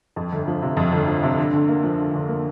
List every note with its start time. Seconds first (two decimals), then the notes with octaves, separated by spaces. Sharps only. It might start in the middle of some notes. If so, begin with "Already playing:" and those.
0.16 F2
0.32 G1
0.48 F3
0.62 C3
0.77 F2
0.92 G1
1.07 F3
1.23 C3
1.38 D3
1.53 D2
1.69 A#3
1.84 F3
1.98 D3
2.14 D2
2.28 A#3